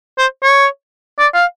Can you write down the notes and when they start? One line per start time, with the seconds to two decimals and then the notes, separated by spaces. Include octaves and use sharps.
0.18 C5
0.43 C#5
1.19 D5
1.34 F5